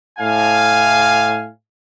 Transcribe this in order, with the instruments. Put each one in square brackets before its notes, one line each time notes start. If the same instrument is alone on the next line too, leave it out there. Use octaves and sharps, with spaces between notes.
[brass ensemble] A2 F5 G#5